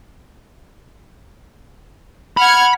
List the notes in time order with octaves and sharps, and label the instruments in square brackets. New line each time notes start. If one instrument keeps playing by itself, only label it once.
[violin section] F#5 F6 G#6 [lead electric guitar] B5